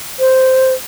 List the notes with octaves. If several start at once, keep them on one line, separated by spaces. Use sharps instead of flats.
C5